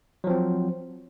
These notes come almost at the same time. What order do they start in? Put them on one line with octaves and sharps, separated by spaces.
F#3 F3 C4